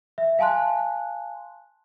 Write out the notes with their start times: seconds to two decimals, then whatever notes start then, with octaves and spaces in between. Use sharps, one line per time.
0.18 E5
0.39 F5 G#5 A5 C6 F#6